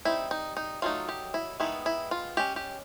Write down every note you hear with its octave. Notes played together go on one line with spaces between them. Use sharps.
G3 C4 D#4 E4
D#4
D#4
F#3 A3 C4 D#4 F4
G4
E4
D#3 G#3 B3 D#4 E4
E4
F4
G#3 C#4 G4
G4